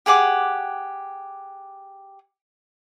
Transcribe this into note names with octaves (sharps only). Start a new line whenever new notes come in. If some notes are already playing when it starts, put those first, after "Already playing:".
G4 G#4 F#5 D6